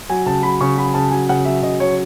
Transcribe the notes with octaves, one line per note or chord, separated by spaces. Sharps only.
F#3 G#5
C#3 A5
F#3 B5
C#3 C#6
F#3 B5
C#3 A5
F#3 G#5
C#3 F#5
F#3 E5
C#3 D#5
F#3 C#5